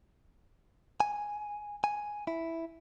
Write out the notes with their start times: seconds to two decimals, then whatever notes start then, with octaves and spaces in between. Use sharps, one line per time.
1.00 G#5
1.84 G#5
2.27 E4